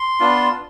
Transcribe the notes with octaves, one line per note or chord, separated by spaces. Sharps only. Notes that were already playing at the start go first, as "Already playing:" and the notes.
Already playing: C6
B3 D4 F4